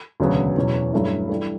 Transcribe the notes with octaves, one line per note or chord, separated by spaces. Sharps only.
E1 D2 C#3 F#3 B3
E1 E2 B2 F#3 C#4
G2 F#3 A3 C#4 E4
E3 G3 D4 A4